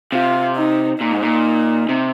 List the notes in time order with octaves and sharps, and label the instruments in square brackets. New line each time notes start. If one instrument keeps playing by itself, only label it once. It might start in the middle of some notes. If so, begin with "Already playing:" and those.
[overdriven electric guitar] C3 [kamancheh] F4
[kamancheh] D#4
[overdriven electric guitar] A#2 [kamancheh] D#4
[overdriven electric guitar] G#2
A#2
C3